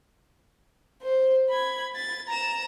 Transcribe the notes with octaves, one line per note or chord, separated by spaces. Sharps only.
C5
B5 G#6
A6
A#5 E7